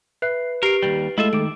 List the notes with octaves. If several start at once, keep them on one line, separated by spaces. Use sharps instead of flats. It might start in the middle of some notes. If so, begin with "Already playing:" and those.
B4 E5 F#6 C7
G4 A#4 C7 D7
D#2 G#2 G3
G#3 A3 E4 F4 A4 D#5 E5 E6
D#3 D6 D7